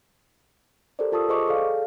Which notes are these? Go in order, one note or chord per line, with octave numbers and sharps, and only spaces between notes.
G4 A4 A#4 C5 D5
F4 A4 A5 C#6 D#6 E6
G#4 C5 D#5 C#6 D6
G#4 A4 D5 F5